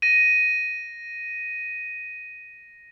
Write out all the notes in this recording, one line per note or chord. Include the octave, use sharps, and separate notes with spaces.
A#6 D#7